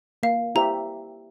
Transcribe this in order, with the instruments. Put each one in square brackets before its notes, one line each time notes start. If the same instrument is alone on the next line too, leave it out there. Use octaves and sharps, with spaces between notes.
[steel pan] A#3 [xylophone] F5
[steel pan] E4 G4 C5 E5 [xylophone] A#5